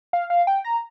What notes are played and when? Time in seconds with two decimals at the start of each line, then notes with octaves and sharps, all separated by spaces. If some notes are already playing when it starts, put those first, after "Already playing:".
0.13 F5
0.30 F5
0.47 G5
0.65 A#5